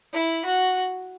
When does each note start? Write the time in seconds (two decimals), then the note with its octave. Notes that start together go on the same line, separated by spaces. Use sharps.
0.13 E4
0.45 F#4